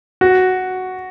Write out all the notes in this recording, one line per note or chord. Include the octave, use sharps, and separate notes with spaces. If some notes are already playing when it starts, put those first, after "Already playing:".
F#4